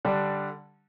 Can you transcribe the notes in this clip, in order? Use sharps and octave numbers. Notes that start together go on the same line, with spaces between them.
D3 G3 D4